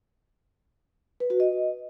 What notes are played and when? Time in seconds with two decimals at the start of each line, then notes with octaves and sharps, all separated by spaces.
1.20 B4
1.30 F#4
1.40 D#5